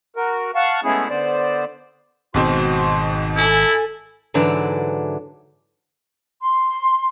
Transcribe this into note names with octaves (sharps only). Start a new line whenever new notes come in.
F#4 A#4
F5 F#5 A5 C#6
G#3 A3 B3 C#4 E4 G#4
D3 B3 C5 D5
G#1 G#2 B2 C4 F#4 C5 C6
E4 A4 G#5
G#2 D3 E3 F#3 D4
C6